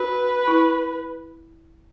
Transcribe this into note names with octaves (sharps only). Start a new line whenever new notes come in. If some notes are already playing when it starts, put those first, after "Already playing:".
Already playing: F#4 B4
E4